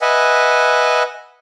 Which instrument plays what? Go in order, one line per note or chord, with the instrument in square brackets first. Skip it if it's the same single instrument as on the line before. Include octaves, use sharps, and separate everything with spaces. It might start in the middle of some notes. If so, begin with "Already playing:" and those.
[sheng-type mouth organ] B4 D#5 E5 F#5 G#5